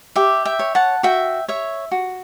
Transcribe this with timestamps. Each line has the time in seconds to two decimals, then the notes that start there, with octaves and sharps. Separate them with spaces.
0.16 G4 E5
0.45 E5 G5
0.59 C#5
0.75 F#5 A5
1.03 F#4 E5 G5
1.48 C#5 E5
1.91 F#4